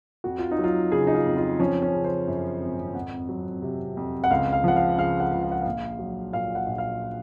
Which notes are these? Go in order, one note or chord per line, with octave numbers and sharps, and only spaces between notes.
F2 F#4
F4
D#4
F#3
F4
C#3 G#4
D#4
F4
F2
F4
F3 C#4
C#4
C#3
C5
F#2
G#1
F2 F#5
F#3
C3
F2
F#5
C#2 F5
F5
F3 F#5
F5
C#3 F5
F#5
C#2
F5
F#5
A#1 F5
F#3
A#2 F5
F#5
A#1
F5